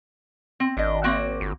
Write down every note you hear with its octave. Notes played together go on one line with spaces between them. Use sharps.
C4
G#1 D4 D#5
A#3 C4 F#4
G1